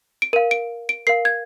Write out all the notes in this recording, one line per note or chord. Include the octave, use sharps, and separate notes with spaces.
D7
A#4 F5 D#7
D7
D7
A#4 F5 C7
G#6